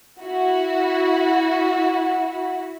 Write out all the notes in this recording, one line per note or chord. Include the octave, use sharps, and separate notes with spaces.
E4 F#4